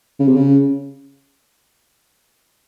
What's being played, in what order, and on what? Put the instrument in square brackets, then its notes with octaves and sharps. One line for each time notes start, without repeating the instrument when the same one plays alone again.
[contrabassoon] C#3
C3
C#3